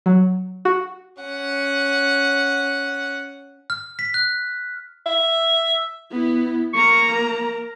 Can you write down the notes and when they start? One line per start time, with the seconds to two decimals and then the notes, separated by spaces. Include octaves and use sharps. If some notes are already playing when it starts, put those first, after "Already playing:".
0.06 F#3
0.65 F#4
1.22 C#4 F#5
3.70 F6
3.99 B6
4.14 F#6
5.06 E5
6.11 B3 E4
6.74 A#3 A#5 C#6
7.12 A#4